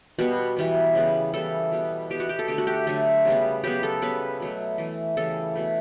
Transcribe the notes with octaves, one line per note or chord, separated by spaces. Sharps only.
B2 G3 B3 F#4
E3 G3 B3
C#3 G3 B3
C#3 E3 G3 B3 A4
B2 G3 B3
E3 G3 B3 G4
F#4
G4
A4
D3 A3 G4
F#4
G4
D3 F#3 A3
C#3 G3 B3
C#3 F#3 B3 G4
A4
C#3 G3 B3 B4
B2 F#3 A3
E3 A3
C#3 E3 G3 A4
B2 A3